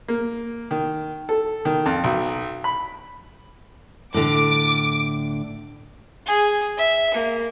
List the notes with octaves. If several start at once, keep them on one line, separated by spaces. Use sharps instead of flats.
A#3
D#3
A4
D#3
F2
B1
B5
A2 D3 D6
G#4
E5
A#3